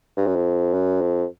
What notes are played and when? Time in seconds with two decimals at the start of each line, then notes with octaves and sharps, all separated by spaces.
0.17 G2
0.27 F#2
0.36 F2
0.74 F#2
1.01 F2